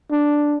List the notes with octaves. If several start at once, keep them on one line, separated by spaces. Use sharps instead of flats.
D4